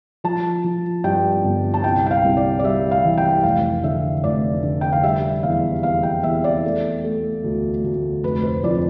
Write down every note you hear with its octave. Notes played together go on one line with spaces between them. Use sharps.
F3 A5
F3
G2 G5
G1
A5
C2 G5
G5
F5
C2
D5
D5
G3 E5
F5
E3
G5
F1 F5
D3 E5
F1 D5
D3
G5
F5
G3 E5
E2 F5
E2 F5
G5
E2 E5
D5
A3
A3
D2
D2
F1 B4
C5
F2 D5